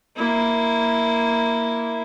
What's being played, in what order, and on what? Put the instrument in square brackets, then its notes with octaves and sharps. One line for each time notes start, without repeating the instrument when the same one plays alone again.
[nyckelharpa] A#3 E4